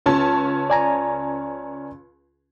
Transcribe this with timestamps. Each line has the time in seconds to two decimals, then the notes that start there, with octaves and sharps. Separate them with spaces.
0.06 C#2 C#4 A5
0.70 D5 G#5 A#5